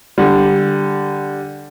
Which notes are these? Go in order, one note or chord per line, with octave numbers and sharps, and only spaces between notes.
D3 G3